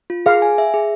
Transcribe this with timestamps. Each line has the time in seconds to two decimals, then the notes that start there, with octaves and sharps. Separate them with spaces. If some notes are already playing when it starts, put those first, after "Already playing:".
0.10 F4
0.26 G#4 F5
0.42 G#5
0.58 E5
0.74 G#4